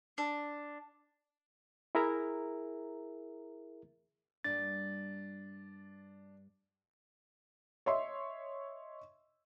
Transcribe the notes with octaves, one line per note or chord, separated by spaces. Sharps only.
D4
E4 G#4 A#4 E5 A#5
G2 A#3 D4 A6
C#5 D#5 E5 C6